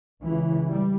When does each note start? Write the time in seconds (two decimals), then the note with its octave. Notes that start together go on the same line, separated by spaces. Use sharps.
0.23 C#2 C#3 E3
0.69 G3